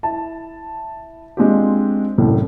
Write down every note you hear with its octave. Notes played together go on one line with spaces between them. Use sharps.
E4 A5
G#3 C4 D4 F4 G4
C2 F#2 A2